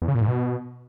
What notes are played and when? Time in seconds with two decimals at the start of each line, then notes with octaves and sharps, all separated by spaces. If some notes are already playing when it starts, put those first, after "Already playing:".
0.02 E2
0.08 C#3
0.15 A#2
0.21 G#2
0.28 B2